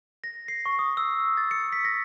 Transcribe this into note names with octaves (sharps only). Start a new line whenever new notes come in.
A#6
C7
C#6
D#6
E6
A6
C#7
B6
A#6